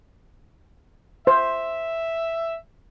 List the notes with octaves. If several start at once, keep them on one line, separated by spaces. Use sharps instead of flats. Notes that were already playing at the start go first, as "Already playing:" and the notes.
C5 E5